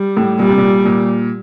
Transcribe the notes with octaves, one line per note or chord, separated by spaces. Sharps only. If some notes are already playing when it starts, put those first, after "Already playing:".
Already playing: G3
A2
A#2 G3
C3
A#2
A#2